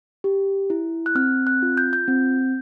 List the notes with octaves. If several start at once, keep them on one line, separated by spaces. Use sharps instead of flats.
G4
E4
F#6
C4 F6
F#6
F4
G6
G6
C4